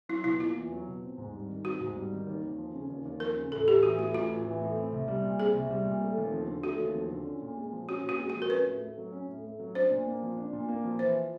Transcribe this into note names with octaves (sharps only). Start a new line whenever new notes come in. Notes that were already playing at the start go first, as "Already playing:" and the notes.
F#3 E4
B2 E4
A#3 F4
E2
F#3
B2
C4
G#2
G3
D#3
C4 F#4
G#2
G3
D#3
D#2
D#2
F3
C#3
D#2
D#2
F3 A#4
C#3
A1 A4
A1 G4
E3 F#4
A2 F#4
A1 F4
A1
E3
A2
C4
C2
G3
A#2
C4 G#4
C2
G3
A#2
A3
D#2
F3
D3
A3 F#4
D#2
F3
D3
C#4
A#2
G#3
F3
C#4 F#4
A#2
F#4
G#3
F#4
F3
A#4
C#4 B4
A2
A3
F#3
C#4
A2
A3
F#3
D4 C5
A#2
A#3
F3
D4
A#2
A#3
F3
E3 C5